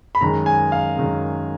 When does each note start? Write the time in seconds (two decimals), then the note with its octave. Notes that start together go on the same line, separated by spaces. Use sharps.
0.15 B5
0.21 F#2 D#3 G#3 A#5
0.46 G#5
0.72 F5
0.97 F#2 D#3 G#3